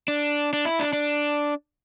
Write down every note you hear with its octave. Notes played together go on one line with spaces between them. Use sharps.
D4
D4
E4
D4
D4